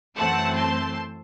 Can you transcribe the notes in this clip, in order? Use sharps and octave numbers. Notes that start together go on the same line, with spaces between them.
F#2 E3 A3 C4 F#5 A5
A5 C6